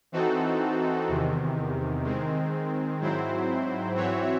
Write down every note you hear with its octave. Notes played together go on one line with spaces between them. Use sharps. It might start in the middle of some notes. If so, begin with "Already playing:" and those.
E3 C4 D#4 F#4 A4
E2 C3 D#3
D#3 G#3 C4
G#2 F#3 C4 E4 C5
E3 C4 F#4 C#5 E5